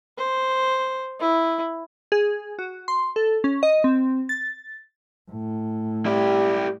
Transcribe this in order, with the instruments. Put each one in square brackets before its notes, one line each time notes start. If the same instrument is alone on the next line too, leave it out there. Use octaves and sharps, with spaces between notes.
[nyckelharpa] C5
E4
[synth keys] G#4
F#4
C6
A4
C#4
D#5
C4
A6
[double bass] A2
[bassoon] G3 [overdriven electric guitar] E4 G4